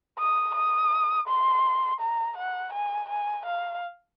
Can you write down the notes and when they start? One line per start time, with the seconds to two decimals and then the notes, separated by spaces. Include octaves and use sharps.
0.19 D#6
0.55 D#6
1.27 C6
2.00 A#5
2.37 F#5
2.73 G#5
3.09 G#5
3.45 F5